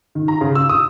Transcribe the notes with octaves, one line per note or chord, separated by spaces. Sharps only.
D#3
A#5
C#3
E6
D#6